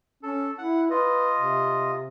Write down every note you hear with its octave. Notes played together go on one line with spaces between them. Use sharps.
C#4 A4
E4 F#5
F4 B4 D#5
C3